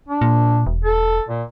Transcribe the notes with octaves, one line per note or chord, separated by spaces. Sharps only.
D4
A#2
E1
A4
A#2